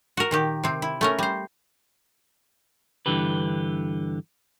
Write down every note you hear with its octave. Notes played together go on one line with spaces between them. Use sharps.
F#4 A#4
A#2 D#3 G4
C3 C4
E4
A3 C#4 A#4
G3 C5
G2 D3 E3 G4 B4